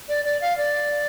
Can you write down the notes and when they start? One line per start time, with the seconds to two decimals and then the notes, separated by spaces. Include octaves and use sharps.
0.09 D5
0.25 D5
0.41 F5
0.58 D5